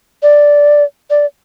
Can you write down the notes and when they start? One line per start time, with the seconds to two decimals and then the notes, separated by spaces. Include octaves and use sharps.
0.23 D5
1.10 D5